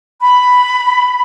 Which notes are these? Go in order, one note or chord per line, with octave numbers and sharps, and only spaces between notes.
B5